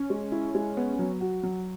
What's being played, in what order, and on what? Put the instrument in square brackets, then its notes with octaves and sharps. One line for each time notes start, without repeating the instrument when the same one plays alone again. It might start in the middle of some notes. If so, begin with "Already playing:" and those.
Already playing: [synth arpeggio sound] C#4
[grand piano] G#3
E4
G#3
B3
F#3
F#4
F#3